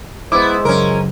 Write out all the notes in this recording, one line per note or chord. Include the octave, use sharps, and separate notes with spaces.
G#3 B3 E4 C5 D6
C#2 F#2 C#4 A#4